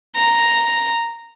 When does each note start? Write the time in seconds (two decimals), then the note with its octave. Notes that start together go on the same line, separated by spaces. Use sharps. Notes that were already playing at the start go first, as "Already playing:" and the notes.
0.16 A#5